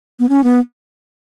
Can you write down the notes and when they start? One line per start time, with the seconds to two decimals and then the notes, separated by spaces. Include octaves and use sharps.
0.19 B3
0.29 C#4
0.44 B3